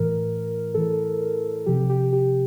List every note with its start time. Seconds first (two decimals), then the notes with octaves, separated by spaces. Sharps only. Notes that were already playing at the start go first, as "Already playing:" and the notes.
Already playing: A2 E3 A#4
0.74 A2 E3 A4
1.66 C3 F3 G4
1.90 G4
2.13 G4